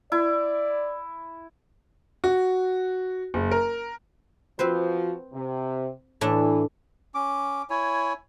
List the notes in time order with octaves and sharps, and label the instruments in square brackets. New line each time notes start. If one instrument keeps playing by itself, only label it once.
[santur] E4 [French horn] D5
[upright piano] F#4
F#1
A#4
[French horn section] F3 F#4 [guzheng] C4 B4 C5
[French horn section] C3
[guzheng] A2 A3 D4 [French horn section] E3
[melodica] C#4 D6
E4 C#5 G#5